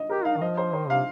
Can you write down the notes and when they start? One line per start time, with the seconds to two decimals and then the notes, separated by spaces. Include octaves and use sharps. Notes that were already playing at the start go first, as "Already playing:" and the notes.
Already playing: D#5
0.09 G4 A#4
0.25 D#4 F5
0.37 D#3
0.41 F3 D#5
0.57 C5
0.73 D#3 C5
0.89 C3 F5